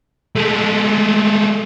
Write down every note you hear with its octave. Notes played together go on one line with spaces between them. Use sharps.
G#3 A3